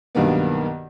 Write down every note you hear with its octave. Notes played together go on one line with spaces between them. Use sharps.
B1 G2 D#3 A#3 B3